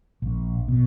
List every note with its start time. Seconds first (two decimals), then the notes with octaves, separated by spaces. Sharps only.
0.22 A#1
0.68 B2